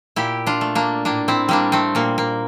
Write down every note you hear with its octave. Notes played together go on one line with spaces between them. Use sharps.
A#2 E4 G4
D4 F4
A3
A#3 D4
A2 A#3 D4
C4 E4
G3 A#3 D4
A3 C4
A#2 A#3
A#3